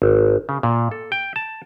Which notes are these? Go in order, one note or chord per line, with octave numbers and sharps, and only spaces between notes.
G#1
C#3
A#2
A4
G5
A5